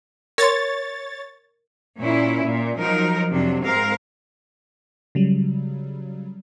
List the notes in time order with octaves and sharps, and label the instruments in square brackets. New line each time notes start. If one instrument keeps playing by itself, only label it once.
[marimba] A#4 C6 [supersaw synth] C#5 A6
[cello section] A#2 C#4 E4
A#2
F3 F#3 D#4 A#4
F2 C3 F#3 D4
G#2 C4 A#4 F5
[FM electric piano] C#3 F#3 G3